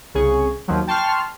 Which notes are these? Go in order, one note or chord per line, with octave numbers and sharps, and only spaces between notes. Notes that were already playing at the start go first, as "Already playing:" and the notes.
C2 C#3 G#4 C#6
D#2 D#3 F3 F#3
G5 A5 C6 C#6 F6